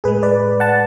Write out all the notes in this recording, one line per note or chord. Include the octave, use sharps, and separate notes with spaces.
A2 G#3 G#4 B4
B4 D5
F#5 A5